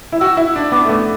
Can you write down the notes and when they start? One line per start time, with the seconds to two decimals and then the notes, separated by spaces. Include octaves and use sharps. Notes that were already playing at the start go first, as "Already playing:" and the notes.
0.12 E4
0.20 F#4 E6
0.37 E4
0.56 D4
0.72 B3 D6
0.85 A3
0.89 B3